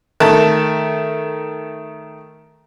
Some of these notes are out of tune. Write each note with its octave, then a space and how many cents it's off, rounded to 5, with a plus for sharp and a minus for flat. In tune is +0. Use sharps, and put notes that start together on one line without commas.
D#3 +0 A3 +0 A5 +0